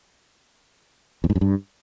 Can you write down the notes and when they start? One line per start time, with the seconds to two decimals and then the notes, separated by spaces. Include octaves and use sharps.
1.24 E2
1.30 G#2
1.35 F#2
1.41 G2